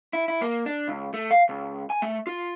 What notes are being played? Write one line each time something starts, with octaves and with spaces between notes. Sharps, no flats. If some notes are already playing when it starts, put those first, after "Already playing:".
E4
E4
A#3
D4
C#2
A3
F5
C#2
G#5
A3
F4